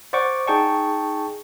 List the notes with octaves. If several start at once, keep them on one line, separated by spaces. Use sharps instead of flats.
C5 D5 F#5 C#6 D6
D#4 G#4 G5 A5 C#6